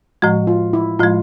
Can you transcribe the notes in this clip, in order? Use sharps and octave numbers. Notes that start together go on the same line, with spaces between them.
A2 F3 G#3 F#4
F4
E4
A2 F3 G#3 F4